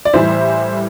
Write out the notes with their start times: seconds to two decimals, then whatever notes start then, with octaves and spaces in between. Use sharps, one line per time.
0.05 D5
0.13 A2 E3 G3 C5 E5